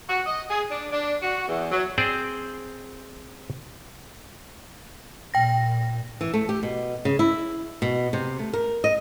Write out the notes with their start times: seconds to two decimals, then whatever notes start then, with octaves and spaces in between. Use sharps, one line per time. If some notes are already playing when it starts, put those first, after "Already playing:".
0.09 F#4
0.26 D#5
0.50 G#4
0.70 D4
0.91 D4
1.22 F#4
1.48 E2
1.72 F#3
1.98 C4 G#4 C5 D5 G5
5.34 A#2 G5 A#6
6.21 E3
6.34 A3
6.49 G4
6.63 B2
7.05 C#3
7.19 E4
7.82 B2
8.13 C3
8.39 A3
8.53 A#4
8.84 D#5